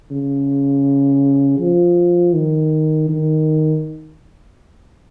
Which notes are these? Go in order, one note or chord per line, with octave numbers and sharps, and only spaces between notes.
C#3
F3
D#3
D#3